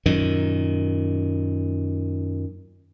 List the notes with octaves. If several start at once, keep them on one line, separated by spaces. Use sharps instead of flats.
F#2 A#2 D#3